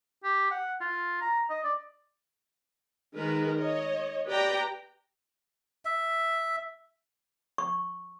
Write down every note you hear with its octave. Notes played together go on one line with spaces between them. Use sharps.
G4
F#5
F4
A#5
D#5
D5
D#3 G#3 A#4 B4
C#5 D#5
G4 B4 D5 G5 A#5
E5
C#6